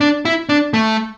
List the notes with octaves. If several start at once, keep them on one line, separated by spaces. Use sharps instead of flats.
D4
E4
D4
A3